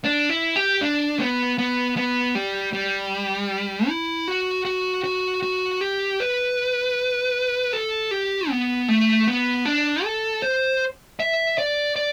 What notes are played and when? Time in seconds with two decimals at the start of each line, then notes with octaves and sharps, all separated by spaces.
0.04 D4
0.29 E4
0.56 G4
0.81 D4
1.19 B3
1.58 B3
1.97 B3
2.35 G3
2.73 G3
3.88 E4
4.28 F#4
4.65 F#4
5.04 F#4
5.43 F#4
5.81 G4
6.20 B4
7.73 A4
8.11 G4
8.50 B3
8.88 A3
9.28 B3
9.65 D4
10.04 A4
10.42 C5
11.20 E5
11.58 D5
11.96 D5